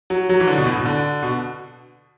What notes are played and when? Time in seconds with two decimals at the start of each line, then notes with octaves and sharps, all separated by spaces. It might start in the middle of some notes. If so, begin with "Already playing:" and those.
0.10 F#3
0.29 F#3
0.40 E3
0.47 D3
0.57 B2
0.66 A2
0.75 B2
0.85 D3
1.22 B2